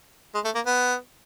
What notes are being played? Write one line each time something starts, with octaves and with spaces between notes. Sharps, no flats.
G#3
A3
A#3
B3